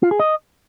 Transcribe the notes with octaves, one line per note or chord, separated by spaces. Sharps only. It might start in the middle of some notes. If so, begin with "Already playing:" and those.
F4
G#4
D#5